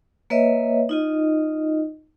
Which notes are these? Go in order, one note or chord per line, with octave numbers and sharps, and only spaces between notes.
A#3 B4 C#5 D#5 E5
D#4 F4 D#5